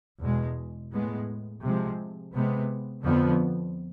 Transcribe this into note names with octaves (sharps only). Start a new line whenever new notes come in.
E2 B2 G#3
A2 G#3 B3
C3 F3 G#3
C3 G#3 B3
F2 D3 F3 B3